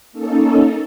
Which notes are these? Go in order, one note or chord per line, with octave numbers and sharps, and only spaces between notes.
A#3 C#4 D#4 A4